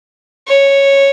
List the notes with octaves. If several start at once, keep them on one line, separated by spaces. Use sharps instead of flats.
C#5